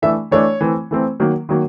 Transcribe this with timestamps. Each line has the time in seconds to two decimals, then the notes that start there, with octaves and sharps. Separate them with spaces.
0.02 E3 A3 D4 E5
0.31 E3 A3 D4 C#5
0.61 E3 A3 C4
0.91 E3 A3 C4
1.20 D#3 F#3 A#3
1.49 D#3 F#3 A#3